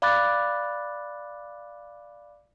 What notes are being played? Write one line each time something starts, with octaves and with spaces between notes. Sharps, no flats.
D5 F5 B5 D6 F#6 A6